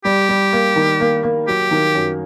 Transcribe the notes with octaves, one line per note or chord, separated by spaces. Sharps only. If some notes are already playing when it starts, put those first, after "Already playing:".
G3 G4
G3
A#3
D#3
A#3
A#3
F#3 G4
D#3
F#2